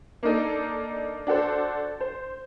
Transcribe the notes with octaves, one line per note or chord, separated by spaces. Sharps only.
A#3 D4 D#4 A4
D4 F#4 A4 C5
C5